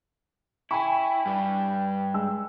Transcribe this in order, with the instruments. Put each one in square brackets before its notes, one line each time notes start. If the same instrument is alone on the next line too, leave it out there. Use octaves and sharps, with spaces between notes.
[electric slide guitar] E4 [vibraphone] G5 [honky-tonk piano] G#5 B5 C#6
[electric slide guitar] G2 G3
[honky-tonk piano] G#3 E6